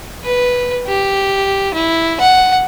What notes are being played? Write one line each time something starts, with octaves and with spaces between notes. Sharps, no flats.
B4
G4
E4
F#5